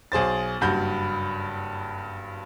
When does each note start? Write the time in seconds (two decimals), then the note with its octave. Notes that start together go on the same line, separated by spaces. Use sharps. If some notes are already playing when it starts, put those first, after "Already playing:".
0.12 B1 G#4 C5 A6
0.61 F#1 G2 F#4 B5 G6